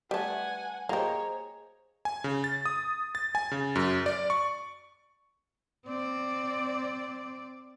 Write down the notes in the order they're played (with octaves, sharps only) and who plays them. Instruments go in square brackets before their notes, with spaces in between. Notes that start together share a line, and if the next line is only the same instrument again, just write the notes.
[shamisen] G3 A3 [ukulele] B4 A5 [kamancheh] F#5 G#5
[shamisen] A#3 G4 [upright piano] G#4 D#5 [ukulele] C5 A#5 [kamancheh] C#5
[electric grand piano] G#5
C#3
A6
D#6
A6
G#5
C#3
F#2
D5
C#6
[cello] C4 D5